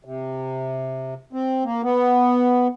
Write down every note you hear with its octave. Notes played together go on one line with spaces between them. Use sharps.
C3
C4
A#3
B3